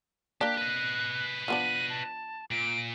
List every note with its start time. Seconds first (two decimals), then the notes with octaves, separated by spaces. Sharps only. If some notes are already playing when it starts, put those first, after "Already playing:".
0.41 A#3 D4 G4 F#6
0.58 B4 D#5
1.48 F3 B3 D4 D#7
1.90 A5
2.51 A#2 D7